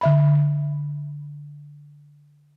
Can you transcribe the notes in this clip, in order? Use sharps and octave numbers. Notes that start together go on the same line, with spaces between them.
D3 E5 B5